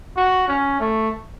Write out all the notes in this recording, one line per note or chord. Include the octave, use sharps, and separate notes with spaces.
F#4
C#4
A3